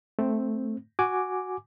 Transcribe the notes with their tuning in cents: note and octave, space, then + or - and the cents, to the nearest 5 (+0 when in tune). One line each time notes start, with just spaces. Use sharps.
A3 +0 C4 +0
F#4 +0 G#5 +0 D6 +0